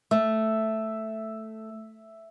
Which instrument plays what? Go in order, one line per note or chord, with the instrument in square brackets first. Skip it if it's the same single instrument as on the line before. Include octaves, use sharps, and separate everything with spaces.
[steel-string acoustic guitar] A3 [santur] E5